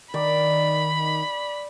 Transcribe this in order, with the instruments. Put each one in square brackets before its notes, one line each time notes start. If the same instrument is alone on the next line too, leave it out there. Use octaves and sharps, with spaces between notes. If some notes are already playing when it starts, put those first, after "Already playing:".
[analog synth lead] D#3 [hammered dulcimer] D5 [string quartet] B5